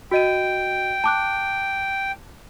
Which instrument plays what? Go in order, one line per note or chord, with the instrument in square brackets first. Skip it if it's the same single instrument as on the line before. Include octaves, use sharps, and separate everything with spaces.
[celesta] F#4 D#5 D#7 [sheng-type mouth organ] G5
[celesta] A5 D6 F#6